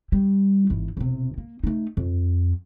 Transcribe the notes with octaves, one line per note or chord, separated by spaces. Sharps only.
G3
G#1 E3
E1 C3
A#3
A3 D#4
F2